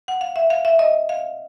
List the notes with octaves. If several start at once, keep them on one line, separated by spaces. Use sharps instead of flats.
F#5
F5
E5
F5
E5
D#5
F5